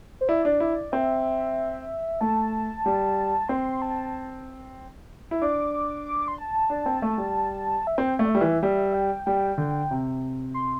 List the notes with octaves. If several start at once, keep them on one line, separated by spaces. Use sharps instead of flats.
C5
E4 D5
D4
E4
C4 E5
A3 A5
G3
C4 C6
A5
E4
D4 D6
D6
C6
A5
D4
C4
A3
G3
E5
C4 G5
A3
D5
E5
G3
E3
G3 E5
G5
G3 G5
D3
C3
C6